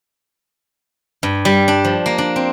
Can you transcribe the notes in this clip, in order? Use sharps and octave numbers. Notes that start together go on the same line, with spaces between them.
G2
G3
D4
F3
A#3
D4
C4